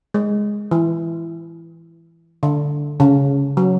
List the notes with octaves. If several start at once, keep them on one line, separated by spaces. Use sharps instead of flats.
G#3
E3
D3
C#3
F#3